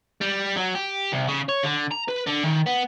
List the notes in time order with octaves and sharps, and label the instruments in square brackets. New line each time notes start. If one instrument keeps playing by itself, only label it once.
[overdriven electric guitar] G3
F#3
G4
C2
C#3
C#5
D3
A#5
B4
D3
D#3
B3